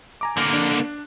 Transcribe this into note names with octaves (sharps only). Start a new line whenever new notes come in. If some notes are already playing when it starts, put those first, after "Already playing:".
G#5 A#5 D6
D3 A#3
D4